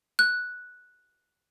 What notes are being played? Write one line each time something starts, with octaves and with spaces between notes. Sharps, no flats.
F#6